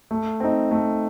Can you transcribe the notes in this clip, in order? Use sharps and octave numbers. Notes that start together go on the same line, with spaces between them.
A3
C4 D#4
A3